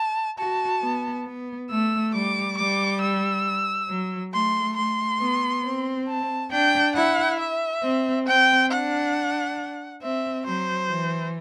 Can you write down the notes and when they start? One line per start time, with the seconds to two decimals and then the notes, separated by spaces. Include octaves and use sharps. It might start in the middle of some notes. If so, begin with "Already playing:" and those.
Already playing: A5
0.39 F#4 A5
0.83 B3
1.26 B3
1.70 A3 E6
2.13 G3 D6
2.57 G3 D6
3.01 E6
3.89 F#3
4.32 A3 C6
4.76 A3 C6
5.20 B3
5.64 C4
6.08 A5
6.52 D4 G5
6.95 E4 F#5
7.39 E5
7.83 C4
8.26 C4 G5
8.71 D4 F#5
10.02 C4 E5
10.46 F#3 C5
10.90 E3